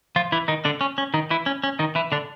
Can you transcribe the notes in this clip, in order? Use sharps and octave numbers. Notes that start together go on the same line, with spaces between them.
F3 F4
E3 E4
D#3 D#4
D3 D4
C#4
C#4
D#3 D#4
E3 E4
C#4
C#4
D#3 D#4
E3 E4
D3 D4